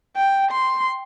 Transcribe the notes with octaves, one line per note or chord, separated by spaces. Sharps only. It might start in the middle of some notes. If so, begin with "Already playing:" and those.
G5
C6